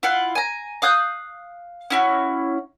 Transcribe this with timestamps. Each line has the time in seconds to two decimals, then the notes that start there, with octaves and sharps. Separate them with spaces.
0.03 E4 F4 F5 F#5
0.35 G#5 A#5
0.82 F5 D#6 F#6 G6
1.90 C#4 E4 F#4